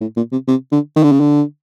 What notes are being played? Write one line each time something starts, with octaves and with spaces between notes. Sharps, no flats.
A2
A#2
C3
C3
D3
D#3
D3
C#3
D3